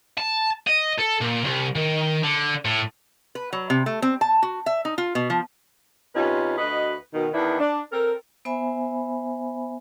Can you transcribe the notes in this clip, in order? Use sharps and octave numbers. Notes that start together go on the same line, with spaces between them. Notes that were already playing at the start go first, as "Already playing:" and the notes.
A5
D#5
A4
A#2
C2
D#3
D3
A2
B4
F#3
C3
A3
C4
A5
F#4
E5
D#4
F4
B2
F3
C3 C#4 D#4 F4 B4
D2 F#4 B4 D#5
B2 D#3
E2 D#3 D4 E4 B4
D4
C4 A4 A#4
B3 C5 E5 G#5 B5